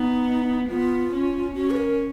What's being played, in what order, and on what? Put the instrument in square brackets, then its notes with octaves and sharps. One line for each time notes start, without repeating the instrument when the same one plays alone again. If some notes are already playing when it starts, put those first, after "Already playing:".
Already playing: [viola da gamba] B3 [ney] D#4
[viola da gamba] B3 [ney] F4
[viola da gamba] C#4
[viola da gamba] C#4 [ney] F#4
[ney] B4
A#4